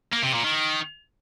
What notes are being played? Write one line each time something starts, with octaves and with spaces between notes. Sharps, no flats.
A#3
C3
A#2
D#3